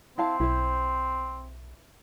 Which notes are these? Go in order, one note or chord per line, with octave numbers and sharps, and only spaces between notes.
C4 E4 F5 A5
B1 E4 C5